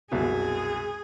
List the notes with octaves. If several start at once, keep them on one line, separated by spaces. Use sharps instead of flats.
C2 F#2 B2 G#4